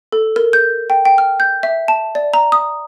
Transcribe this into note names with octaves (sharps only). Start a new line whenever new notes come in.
A4
A#4
G6
G5
G5
F6
G6
E5
A5
D5
A#5
D#6